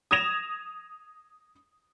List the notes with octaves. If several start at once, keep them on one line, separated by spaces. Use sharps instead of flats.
D#6 G#6 A#6 E7 F7